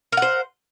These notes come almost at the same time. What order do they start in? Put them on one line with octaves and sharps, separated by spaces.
A#4 F#5 C5